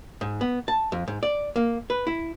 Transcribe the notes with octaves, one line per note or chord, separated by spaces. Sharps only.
G#2
B3
A5
F2
G#2
D5
A#3
B4
E4